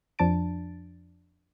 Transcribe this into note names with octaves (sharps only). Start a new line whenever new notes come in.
F2 F3 D4 A5 A6 D7